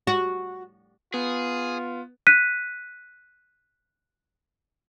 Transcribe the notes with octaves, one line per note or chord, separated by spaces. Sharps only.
F#4
B3 F4 G#4
F#6 B6 D#7